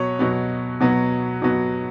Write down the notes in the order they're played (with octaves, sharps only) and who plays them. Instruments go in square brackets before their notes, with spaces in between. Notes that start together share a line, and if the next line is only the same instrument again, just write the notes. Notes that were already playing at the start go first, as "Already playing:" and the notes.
Already playing: [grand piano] B2 F#3 B3 C#5
B2 F#3 B3
B2 F#3 B3
B2 F#3 B3